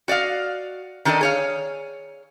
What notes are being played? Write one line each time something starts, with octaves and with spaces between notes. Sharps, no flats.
F#4 D5 D#5 F5
D#3 D4 A4 A#4 D5 D#5
G#4 C#5 F5